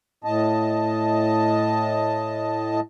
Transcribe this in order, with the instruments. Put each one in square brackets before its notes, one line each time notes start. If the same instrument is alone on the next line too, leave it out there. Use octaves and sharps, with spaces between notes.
[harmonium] A2 D#5 A5